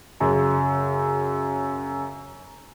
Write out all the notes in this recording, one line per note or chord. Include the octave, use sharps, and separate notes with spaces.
F#2 C#3